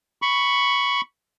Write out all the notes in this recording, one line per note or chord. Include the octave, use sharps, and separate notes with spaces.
B5 C#6